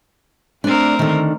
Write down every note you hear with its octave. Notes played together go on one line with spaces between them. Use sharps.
A3 C4 D4 A#4 D5
D3 D#3